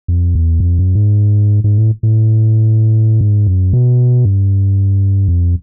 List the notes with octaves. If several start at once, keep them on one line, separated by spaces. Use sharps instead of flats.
F2
E2
F2
F#2
G#2
G#2
A2
A2
G#2
F#2
B2
G2
F2